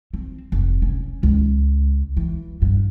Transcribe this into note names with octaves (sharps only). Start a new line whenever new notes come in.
C4
F1
C#4
C#2
E3
G2